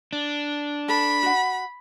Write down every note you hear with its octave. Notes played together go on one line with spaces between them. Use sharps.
D4
A4 B5
F#4 F#5